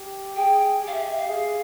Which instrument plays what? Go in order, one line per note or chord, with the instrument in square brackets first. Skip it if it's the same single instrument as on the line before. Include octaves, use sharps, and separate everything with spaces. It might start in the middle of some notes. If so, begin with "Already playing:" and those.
Already playing: [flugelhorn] G4
[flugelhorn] G#4 [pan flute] G5
[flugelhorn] G4 [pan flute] F5
[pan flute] E5
E5
F5
[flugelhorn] G#4